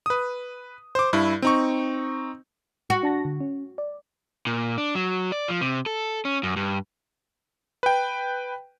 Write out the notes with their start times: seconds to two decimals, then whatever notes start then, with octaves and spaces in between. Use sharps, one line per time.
0.06 B4 D#6
0.95 C5 D6
1.13 G2 E4
1.42 C4 D#4 C#6
2.90 F#4
3.03 D4 A5 A#6
3.25 D3
3.40 C#4
3.78 D5
4.47 A#2
4.78 D4
4.95 F#3
5.32 D5
5.48 F3
5.61 C3
5.86 A4
6.25 C#4
6.43 F#2
6.56 G2
7.83 B4 G5